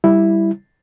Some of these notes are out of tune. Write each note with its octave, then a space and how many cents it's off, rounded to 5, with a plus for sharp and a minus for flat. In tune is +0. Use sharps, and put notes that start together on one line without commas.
G3 +0 E4 +0